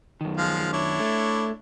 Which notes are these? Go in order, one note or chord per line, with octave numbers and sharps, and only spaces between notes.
F#2 D#3
F3 G#3 F5
D4 E4 C#5
A3